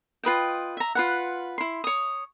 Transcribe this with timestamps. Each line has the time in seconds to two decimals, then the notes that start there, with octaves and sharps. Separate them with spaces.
0.24 F4 B4 D#5 G5
0.77 E5 A#5
0.95 F4 B4 F#5
1.58 E4 C6
1.84 C#5 D#6